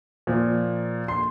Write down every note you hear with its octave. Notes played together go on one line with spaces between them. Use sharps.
A#2 F3
C6